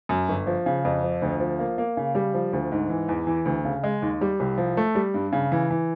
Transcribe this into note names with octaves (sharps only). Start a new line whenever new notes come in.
F#2
G1
F3
C#3
F2
F3
D2
F3
A#3
A#3
C#3
G3
F3
D2
G#2
E3
E2
E3
D2
C#3
G#3
D#2
G3
C2
F3
A3
G3
G2
C#3
E3
E3